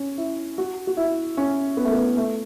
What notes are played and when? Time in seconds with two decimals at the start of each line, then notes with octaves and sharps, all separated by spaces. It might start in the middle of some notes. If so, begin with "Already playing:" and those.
Already playing: C#4
0.18 E4
0.58 F#4
0.87 F#4
0.97 E4
1.37 C#4
1.77 B3
1.85 A3
1.92 B3
2.17 A3